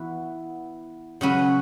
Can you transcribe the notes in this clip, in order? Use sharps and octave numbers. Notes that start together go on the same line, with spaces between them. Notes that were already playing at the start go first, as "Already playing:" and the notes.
Already playing: E3 B3 F#4 B4
C#3 F#3 C#4 F#4 B4